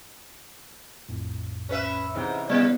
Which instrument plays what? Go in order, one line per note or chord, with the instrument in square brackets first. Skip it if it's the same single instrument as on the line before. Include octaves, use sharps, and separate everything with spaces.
[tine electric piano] A#1 F2 A2
[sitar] C#4 B4 E5
[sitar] G#2 [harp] C3 E3 D#4
[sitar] C#3 G3 [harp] B3 [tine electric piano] D5